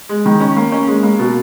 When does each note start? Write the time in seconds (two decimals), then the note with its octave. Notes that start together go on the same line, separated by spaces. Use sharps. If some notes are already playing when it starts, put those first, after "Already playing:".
0.09 G#3
0.26 D#3
0.40 C#4
0.56 A#3
0.72 C#4
0.88 G#3
1.03 A#3
1.19 B2